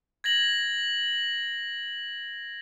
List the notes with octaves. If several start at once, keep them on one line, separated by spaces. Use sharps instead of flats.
G#6 A#6 F#7